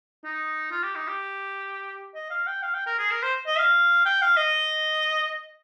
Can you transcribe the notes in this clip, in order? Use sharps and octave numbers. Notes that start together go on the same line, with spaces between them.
D#4
F4
G4
D#4
G4
D#5
F5
G5
F5
G5
A#4
G#4
A#4
C5
D#5
F5
G5
F5
D#5